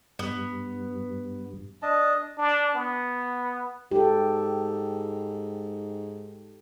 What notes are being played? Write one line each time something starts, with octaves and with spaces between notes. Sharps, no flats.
G2 B3
D4 D#5 A5
D4
B3
G#2 G4 A4